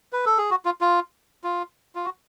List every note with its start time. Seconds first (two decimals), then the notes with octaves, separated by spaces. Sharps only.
0.13 B4
0.26 A4
0.38 G#4
0.51 F#4
0.65 F4
0.81 F4
1.44 F4
1.95 F4
2.05 F#4